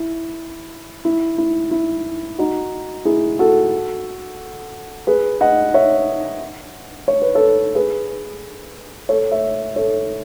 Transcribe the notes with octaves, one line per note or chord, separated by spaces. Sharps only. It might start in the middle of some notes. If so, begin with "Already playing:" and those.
Already playing: E4
E4
E4
E4
D#4 F#4
E4 G#4
F#4 A4
G#4 B4
D#5 F#5
C#5 E5
C#5
B4
A4 C#5
G#4 B4
A4 C#5
C#5 E5
A4 C#5